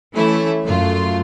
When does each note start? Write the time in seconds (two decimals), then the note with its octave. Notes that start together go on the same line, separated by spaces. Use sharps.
0.13 E3 A3 C#4 E4
0.65 F#2 A3 F4